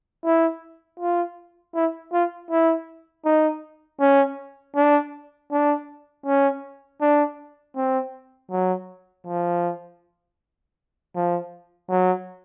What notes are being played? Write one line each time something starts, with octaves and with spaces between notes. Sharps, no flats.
E4
F4
E4
F4
E4
D#4
C#4
D4
D4
C#4
D4
C4
F#3
F3
F3
F#3